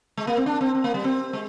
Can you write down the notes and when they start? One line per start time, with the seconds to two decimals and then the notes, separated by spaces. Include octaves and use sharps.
0.17 G#3
0.27 A#3
0.37 C4
0.46 D4
0.61 C4
0.75 C4
0.84 A#3
0.94 G3
1.04 C4
1.33 G#3